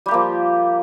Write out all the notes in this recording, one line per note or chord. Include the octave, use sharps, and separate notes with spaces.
F3 G3 A#3 G4